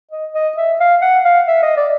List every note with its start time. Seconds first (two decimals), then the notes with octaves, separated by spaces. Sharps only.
0.11 D#5
0.34 D#5
0.57 E5
0.80 F5
1.02 F#5
1.25 F5
1.48 E5
1.63 D#5
1.77 D5